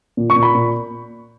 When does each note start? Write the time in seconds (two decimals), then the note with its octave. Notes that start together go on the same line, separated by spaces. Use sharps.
0.17 A#2
0.30 C#6
0.36 A#2
0.43 B5
0.55 A#2